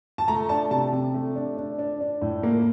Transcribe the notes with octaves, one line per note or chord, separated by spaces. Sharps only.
A5
A3 A#5
D4 A5
C3 A5
C3
A3
D4
D4
D4
D4
A2
A#3